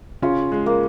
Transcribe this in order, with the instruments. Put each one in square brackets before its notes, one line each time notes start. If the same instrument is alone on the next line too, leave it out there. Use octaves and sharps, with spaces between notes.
[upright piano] C#3 C#4 [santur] F4
[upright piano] G#3
[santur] A#3